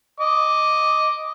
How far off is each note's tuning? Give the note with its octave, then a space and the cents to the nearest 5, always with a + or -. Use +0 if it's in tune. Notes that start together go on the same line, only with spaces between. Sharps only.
D#5 +0 D6 +0